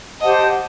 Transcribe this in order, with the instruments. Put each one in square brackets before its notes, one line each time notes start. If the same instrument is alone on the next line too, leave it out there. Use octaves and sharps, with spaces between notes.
[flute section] G4 C5 F#5 A5 [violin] D#5